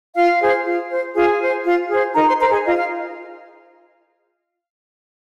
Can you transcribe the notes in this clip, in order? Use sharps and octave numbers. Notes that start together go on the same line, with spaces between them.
F4 F5
G#4 C5
F4
C5
F4 G#4 G#5
C5
F4
G#4 C5
D#4 A#4 A#5
C5 C6
A#4 C5 A#5
G#4 G#5
F4 D#5
F5